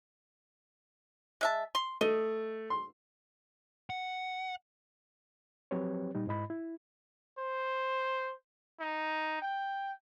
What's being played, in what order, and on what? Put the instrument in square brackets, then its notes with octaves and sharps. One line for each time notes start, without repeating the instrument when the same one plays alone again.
[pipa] G#3 E5 A5
C6
[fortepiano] A3 [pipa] D#5
[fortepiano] C6
[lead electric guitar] F#5
[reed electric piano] F3 F#3 C4 G4 B4 C#5
A#2 G3 D#4
G#2 E4 D#5 B5
E4
[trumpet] C5
D#4
G5